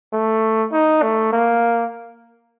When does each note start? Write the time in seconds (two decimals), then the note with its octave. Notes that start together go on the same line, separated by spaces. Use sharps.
0.13 A3
0.72 D#4
1.03 A3
1.33 A#3